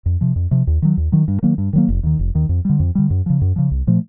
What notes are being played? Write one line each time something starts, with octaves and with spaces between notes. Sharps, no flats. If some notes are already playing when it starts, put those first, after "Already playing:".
F2
C3 F3
F2
C3 F3
D#2
D#3 F#3
D#2
D#3 F#3
G2
D#3 F#3 A#3
G2
D#3 F#3 A#3
F1
D#2 D#3
F1
D#2 D#3
F2
D3 G3
F2
D3 G3
F#2
C#3 F3
F#2
C#3 F3
C2
A#2 F3 A3